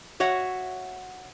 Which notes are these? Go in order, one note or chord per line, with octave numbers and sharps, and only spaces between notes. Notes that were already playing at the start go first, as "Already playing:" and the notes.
F#4 C#5 E5 F#5